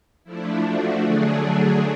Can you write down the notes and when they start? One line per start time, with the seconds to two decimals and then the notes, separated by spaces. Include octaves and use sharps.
0.24 F3 A3 D4 E4
0.64 F#4
1.03 D3 F#3 A3 D4 G#4
1.42 G#4